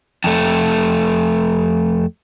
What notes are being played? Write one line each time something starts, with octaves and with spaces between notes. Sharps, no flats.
F2 A3